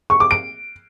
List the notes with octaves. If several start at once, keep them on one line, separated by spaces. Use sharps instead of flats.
C#6
D6
D7